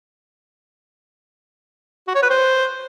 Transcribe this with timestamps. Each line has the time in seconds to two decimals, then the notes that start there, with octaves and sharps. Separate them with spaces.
2.08 F#4
2.15 C#5
2.22 B4
2.30 C5